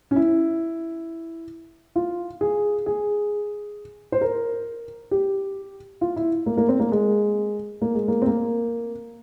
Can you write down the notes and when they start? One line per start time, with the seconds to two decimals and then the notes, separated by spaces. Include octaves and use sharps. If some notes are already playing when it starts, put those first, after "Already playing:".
0.11 C#4
0.16 E4
1.96 F4
2.41 G#4
2.86 G#4
4.12 C5
4.21 A#4
5.11 G4
6.01 F4
6.16 E4
6.46 A#3
6.57 A#3
6.69 C4
6.80 A#3
6.92 G#3
7.82 A#3
7.95 G#3
8.08 A#3
8.22 C4
8.27 A#3